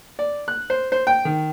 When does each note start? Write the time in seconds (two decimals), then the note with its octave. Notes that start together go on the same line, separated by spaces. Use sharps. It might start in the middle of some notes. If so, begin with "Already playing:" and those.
0.19 D5
0.48 F#6
0.70 C5
0.92 C5
1.07 G5
1.25 D#3